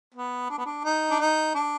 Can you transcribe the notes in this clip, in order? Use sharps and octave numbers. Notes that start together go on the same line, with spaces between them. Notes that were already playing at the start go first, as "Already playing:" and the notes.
B3
D4
B3
D4
D#4
D4
D#4
D4